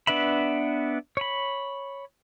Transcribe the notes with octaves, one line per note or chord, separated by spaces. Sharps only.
B3 D4 B4 E5 B5
C#5 B5